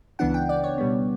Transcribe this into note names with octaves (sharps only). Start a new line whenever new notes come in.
C#2 C#3 E3 B3 D4 F#5
G5
D5
C#5
B2 G3 B3